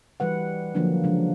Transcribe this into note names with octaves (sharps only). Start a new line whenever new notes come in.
E3 G3 B4 F#5
D3 F3 F#3 A#3 D4
C#3 F3 G#3 D4